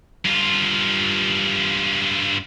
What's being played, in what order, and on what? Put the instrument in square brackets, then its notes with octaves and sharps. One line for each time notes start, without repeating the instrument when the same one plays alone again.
[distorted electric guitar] G2 F4